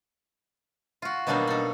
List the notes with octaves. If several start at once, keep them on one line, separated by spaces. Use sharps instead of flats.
F4 F#4
B2 F#3 G3 A#3 D4 D#4
D#4 A4